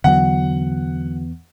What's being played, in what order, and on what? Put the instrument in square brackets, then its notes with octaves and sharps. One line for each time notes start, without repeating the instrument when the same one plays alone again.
[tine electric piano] E2 E3 B3 [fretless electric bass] D3 F#3 [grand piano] F#5